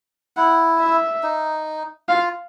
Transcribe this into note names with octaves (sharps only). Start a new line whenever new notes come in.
E4 F#5
E5
D#4
F4 F5